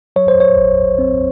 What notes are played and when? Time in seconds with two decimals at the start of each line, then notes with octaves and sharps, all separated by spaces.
0.16 F#3 C#5
0.28 C5
0.40 C#5
0.57 A1
0.99 C4